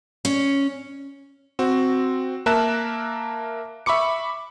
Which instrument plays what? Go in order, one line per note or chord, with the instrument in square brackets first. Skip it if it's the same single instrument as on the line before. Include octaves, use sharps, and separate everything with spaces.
[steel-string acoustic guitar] C#4
[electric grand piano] C4 F#4
A#3 A#4 E5 A5 F#6 E7
E5 B5 C#6 D6 C#7